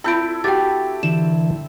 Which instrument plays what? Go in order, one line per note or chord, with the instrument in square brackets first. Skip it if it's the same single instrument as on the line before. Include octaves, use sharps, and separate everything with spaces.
[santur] C4 E4 A4 [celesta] F4 G6 D7 [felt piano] B5
[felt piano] F#4 G4 [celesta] G5 A6
[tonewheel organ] D3 E3 [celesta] E7